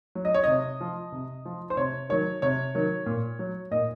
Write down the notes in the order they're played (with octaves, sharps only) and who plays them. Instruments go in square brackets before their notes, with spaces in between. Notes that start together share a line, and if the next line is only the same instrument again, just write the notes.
[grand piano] F#3
D#5
C#5
C3 D#5
F3
C3
F3
C5
C3 C#5
D#3 F#3 C#5
C3 C#5
D#3 F#3
A#2
F#3
A#2 D#5